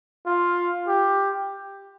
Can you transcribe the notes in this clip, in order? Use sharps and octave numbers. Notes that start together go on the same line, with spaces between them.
F4
G4